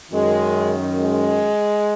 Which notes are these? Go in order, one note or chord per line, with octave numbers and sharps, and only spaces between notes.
F#2 D#3 G#3
G#3